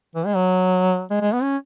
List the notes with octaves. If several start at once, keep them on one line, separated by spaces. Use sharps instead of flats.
E3
G#3
F#3
G#3
G#3
B3
C#4